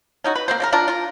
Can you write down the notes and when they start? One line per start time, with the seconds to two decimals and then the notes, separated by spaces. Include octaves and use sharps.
0.24 C#4 D#4 F#4
0.35 B4
0.48 A#3 C4 C5
0.60 C#3 F#4 A#4
0.72 D4 F4 A#4
0.88 F4 A#4